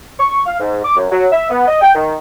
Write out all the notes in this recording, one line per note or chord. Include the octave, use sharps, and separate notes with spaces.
C#6
F5
G#2
D6
F#2
F#3
E5
B3
D#5
G5
D#3